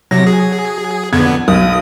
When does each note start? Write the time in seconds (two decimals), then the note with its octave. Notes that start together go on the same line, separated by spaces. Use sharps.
0.11 C3 F#3 A#6
0.27 G#4
1.13 F2 D3 B3 G#6
1.48 B1 D#6